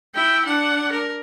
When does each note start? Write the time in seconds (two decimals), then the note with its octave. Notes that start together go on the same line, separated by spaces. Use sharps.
0.15 E4 G5
0.45 D4 F#5
0.92 A#4